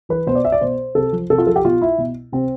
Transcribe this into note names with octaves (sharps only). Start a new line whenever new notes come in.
E3 B4
B2 C5
D5
E5
D5
B2 C5
C3 A4
F3
C3 A4
F4
F3 A4
G4
B2 F4
E4
B2
C3 C4